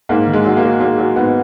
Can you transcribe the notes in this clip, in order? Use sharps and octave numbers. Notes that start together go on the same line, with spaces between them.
G#2 A#3
D#3
G#3
F#3
A#3
F#3
F#3 A#3
F#3
G#2 B3